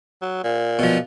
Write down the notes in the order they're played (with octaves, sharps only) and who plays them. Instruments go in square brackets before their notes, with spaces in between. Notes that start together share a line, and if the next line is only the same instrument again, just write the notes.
[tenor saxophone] F#3
A#2
[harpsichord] B2 F3